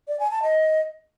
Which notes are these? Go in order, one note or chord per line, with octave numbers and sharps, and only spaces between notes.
D5
G#5
A5
D#5